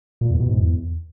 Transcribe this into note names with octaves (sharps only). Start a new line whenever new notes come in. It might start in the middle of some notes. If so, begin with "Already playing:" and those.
A#2
E2
B2
G#2
E2